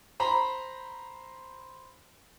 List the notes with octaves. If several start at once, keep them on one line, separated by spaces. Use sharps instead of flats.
C5 A#5 B5